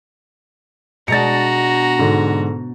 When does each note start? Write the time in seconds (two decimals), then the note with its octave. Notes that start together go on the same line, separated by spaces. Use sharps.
1.08 B2 G#3 D4 F#4 A#5 A6 C#7
1.99 G#2 D3